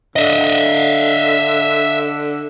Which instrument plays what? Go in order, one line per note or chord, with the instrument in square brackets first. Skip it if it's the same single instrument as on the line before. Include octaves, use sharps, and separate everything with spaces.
[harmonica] D3 [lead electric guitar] D#5 E5